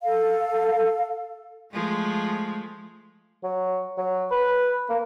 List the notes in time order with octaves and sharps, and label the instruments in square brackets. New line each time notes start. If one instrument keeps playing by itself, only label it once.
[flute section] A4 F5
[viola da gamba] F3 G#3 A3
[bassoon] F#3
F#3
B4
A#3